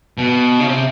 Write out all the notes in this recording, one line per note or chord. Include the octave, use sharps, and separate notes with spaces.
B2
C#3
C3